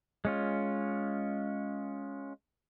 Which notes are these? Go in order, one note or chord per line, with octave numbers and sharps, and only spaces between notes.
G#3 C#4 F4